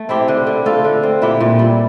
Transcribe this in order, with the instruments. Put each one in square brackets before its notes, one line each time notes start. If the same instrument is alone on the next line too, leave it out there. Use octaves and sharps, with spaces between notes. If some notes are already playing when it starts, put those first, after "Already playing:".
Already playing: [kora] A3
C4 E4 G4
D3
D3
A3 F4 A4
D3
C4
A#2 E4 G4
A#2
G3